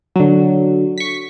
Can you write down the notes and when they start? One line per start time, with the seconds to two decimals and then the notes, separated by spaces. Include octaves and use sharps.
0.16 D3 F#3
0.98 C#6 B6